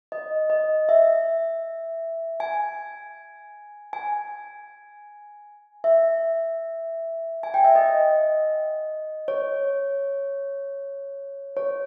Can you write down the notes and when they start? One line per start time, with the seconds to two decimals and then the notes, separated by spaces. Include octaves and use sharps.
0.12 D#5
0.50 D#5
0.89 E5
2.40 G#5
3.93 G#5
5.84 E5
7.43 G#5
7.54 G5
7.64 E5
7.75 D#5
9.28 C#5
11.57 C#5